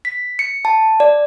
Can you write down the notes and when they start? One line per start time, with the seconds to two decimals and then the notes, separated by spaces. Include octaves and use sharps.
0.05 B6
0.39 C#7
0.65 A5
1.00 D5